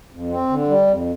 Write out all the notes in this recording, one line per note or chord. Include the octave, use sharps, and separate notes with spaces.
F2
C4
D3
G3
F2